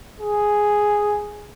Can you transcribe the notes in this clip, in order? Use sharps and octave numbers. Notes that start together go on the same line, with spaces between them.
G#4